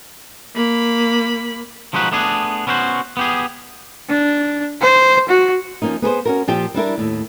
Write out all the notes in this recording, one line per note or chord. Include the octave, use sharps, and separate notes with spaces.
A#3 B5
F3 G#3 D#4 F#4 B4
A3 B3 D4 G#4
B3 C#4 E4 F#4 C5
B3 G4 G#4
D4
C5
F#4
F3 A#3 C#4 D#4
B3 G#4 B4 C5
C#4 F#4 A#4
A#2 F3 G4 G5
G3 D4 E4 A#4
D#2 A2